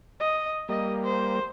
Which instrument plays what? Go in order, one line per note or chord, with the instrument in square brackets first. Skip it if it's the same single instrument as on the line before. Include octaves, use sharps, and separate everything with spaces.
[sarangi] D#5
[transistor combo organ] G3 A#3 [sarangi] D#5
[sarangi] C5